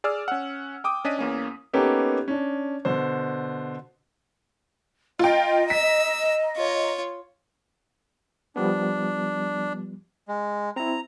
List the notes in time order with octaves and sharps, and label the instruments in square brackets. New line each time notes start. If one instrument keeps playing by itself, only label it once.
[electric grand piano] G#4 D5 E6 F6
C#4 F#5
G5 D6 D#6
C#4 D4 D#5 B6 D#7
E2 A#3 C#4
[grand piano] A#3 B3 C#4 D#4 G4 A4
C#4 D4
B2 D3 C5
[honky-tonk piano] F4 G5 [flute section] D#5 A#5
[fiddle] E6 [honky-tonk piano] B6
[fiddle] F4 C#5
[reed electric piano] F3 G3 B3 [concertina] D4
[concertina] G#3
[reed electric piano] C4 E4 [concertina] A#5